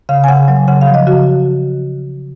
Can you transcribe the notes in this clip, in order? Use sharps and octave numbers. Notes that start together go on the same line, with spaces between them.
C#3 F5
G#5
C#3 F#5
F#3
C#3 F#5
F5
F3
D#5
C#3 F#4